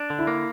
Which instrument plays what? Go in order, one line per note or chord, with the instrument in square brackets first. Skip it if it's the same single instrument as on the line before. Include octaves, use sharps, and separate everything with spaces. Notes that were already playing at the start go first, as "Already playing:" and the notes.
Already playing: [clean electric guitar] D4
D3
[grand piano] E4
[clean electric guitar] A#3